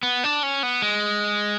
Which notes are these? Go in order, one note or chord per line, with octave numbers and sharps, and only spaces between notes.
B3
D4
C#4
B3
G#3